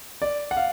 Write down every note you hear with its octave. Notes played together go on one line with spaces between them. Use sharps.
D5
F#5
F5